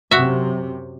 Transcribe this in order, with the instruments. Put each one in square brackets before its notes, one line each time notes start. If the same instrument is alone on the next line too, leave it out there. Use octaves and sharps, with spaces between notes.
[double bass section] F#2 C3 [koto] F#4 E5